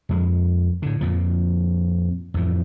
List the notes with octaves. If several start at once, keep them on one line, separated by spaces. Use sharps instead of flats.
F2 G#3
A2 D3
F2 A#2 F3
F2 A2 E3